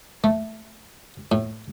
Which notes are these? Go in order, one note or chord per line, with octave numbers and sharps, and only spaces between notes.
A3
A2